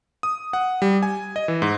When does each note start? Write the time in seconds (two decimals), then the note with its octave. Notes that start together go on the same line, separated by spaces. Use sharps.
0.23 D#6
0.53 F#5
0.82 G3
1.03 G#5
1.36 D#5
1.48 E3
1.62 G#2